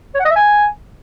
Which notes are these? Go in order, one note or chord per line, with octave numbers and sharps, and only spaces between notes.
C#5
F#5
D#5
E5
G#5